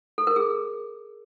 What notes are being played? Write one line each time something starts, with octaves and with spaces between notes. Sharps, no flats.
A4
A#4
G#4